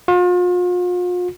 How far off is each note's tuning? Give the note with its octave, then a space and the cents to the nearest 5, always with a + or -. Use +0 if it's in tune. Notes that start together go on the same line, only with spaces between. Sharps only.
F4 +40